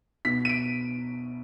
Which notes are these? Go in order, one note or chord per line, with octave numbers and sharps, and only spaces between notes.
B2 B6
D#7
D7